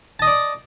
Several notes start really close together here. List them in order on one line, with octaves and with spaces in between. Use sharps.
A5 D#5 D#6 D5